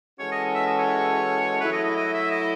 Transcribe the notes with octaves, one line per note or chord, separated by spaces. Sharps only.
E3 G#3 C#4 F#4 A4 C#5
D#5
E5
D#5
C#5
F#3 A3 E4 B4
D#5
D#5
D#5
E5
D#5